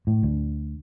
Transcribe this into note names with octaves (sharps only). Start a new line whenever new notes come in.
A2
D2